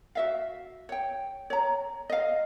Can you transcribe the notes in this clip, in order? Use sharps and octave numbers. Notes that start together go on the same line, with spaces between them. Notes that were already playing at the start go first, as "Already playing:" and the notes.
F#4 E5 F5
C#5 G5
C#5 A#5
D#5 F5